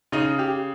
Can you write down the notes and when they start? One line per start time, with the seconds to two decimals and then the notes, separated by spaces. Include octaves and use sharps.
0.12 C#3 D#4
0.39 G4